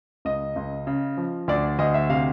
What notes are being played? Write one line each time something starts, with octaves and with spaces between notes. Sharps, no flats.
C#2 D#5
C#2
C#3
F3
D2 D5
D2 D#5
E5
C3 F5